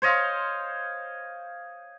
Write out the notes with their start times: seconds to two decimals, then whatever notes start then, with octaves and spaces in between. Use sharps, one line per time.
0.02 C5 C#5 D#5 F5